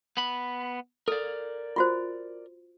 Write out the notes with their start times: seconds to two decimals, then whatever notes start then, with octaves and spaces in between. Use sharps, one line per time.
0.17 B3 B5
1.08 A4 A#4 D5
1.76 F4 F#4 C5